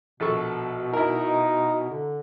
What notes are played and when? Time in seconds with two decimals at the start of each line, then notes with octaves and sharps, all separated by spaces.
0.20 A#1 B2 A4 C#6
0.93 D#4 E4 A#4
1.90 D3